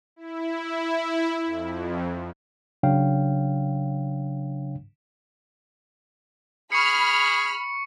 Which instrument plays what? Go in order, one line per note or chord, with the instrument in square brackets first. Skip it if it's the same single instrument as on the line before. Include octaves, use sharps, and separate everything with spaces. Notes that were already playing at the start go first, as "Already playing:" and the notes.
[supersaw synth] E4
F2
[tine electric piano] C#3 F#3 D4 C#5 F5 G5
[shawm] G#4 [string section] B5 F6 [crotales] C#6 C#7